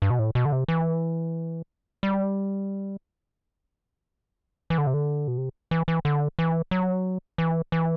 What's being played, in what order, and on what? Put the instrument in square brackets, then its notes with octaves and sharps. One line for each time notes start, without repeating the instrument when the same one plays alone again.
[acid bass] G2
B2
A2
B2
D3
C3
E3
G3
E3
D3
C3
D3
B2
C3
E3
E3
D3
E3
F#3
E3
E3